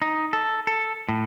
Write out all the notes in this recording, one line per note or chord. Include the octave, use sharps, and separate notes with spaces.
D#4
A4
A4
A2